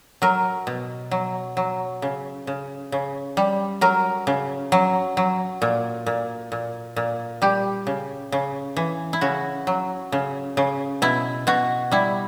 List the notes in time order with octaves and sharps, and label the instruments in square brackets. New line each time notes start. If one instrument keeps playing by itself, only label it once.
[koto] F#3 A#4
B2
F#3
F#3
C#3
C#3
C#3
G3
F#3 A#4
C#3
F#3
F#3
A#2
A#2
A#2
A#2
G3 G4
C#3
C#3
E3
E4
C#3 F#4
F#3
C#3
C#3
B2 E4
B2 F#4
G3 E4